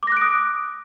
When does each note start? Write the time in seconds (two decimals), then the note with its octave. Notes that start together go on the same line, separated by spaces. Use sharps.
0.03 D6
0.07 A#6
0.12 F#6
0.17 D7
0.21 D#6